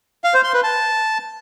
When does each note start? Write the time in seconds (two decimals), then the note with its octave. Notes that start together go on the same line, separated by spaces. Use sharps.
0.24 F5
0.34 C5
0.44 C6
0.54 B4
0.64 A5